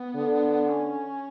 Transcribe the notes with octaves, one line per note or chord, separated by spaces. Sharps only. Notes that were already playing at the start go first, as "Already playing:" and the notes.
Already playing: B3
D3
C#4